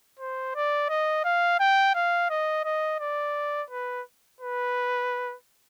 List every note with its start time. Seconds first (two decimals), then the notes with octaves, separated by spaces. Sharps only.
0.19 C5
0.55 D5
0.89 D#5
1.24 F5
1.60 G5
1.95 F5
2.30 D#5
2.64 D#5
3.00 D5
3.70 B4
4.40 B4